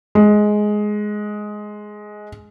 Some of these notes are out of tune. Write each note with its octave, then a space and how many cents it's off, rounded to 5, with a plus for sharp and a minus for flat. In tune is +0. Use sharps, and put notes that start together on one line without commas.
G#3 +10